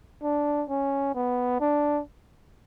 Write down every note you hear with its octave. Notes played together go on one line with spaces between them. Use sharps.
D4
C#4
B3
D4